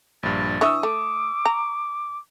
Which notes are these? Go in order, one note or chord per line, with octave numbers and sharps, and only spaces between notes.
A#1 G2 A6
E3 D4 E5 C#6 D#6 E6
A3 D6
A#5